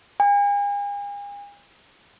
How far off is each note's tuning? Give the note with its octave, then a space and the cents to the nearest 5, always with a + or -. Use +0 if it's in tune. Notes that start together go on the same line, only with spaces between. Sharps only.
G#5 -40